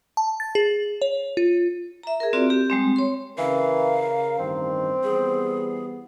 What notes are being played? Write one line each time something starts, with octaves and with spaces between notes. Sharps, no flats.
A5
A6
G#4
C#5
F4
E5 A#5
G#4 A#4
C4 F4 F#4 D5
G4
G3 G#3 C4
C#5 C6
C#3 E3 A#4 F5
A1 G2 D#3 C4
E3 G3 B3 G#4